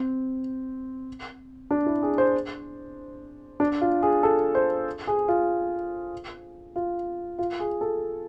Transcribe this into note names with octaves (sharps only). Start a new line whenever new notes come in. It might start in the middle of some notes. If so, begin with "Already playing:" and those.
Already playing: C4
D4
E4
G#4
C5
D4
F4
G#4
A4
C5
G#4
F4
F4
F4
G#4
A4